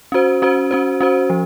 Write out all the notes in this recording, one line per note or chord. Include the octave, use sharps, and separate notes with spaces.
C#4 F#4 C5
C#4 F#4 C5
C#4 F#4 C5
C#4 F#4 C5
F3